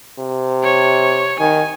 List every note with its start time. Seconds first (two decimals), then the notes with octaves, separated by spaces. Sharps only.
0.19 C3
0.63 C#5
1.39 D#3 G#5